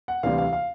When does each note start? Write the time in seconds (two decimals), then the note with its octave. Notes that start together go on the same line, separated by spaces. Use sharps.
0.08 F#5
0.23 D2 C3 E3 G3 F5
0.38 F5
0.53 F5